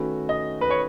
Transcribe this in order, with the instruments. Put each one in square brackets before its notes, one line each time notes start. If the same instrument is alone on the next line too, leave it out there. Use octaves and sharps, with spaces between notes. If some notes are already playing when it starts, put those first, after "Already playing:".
Already playing: [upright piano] D#3 A3 C#4 F#4 B4
[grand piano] D#5
B4
C#5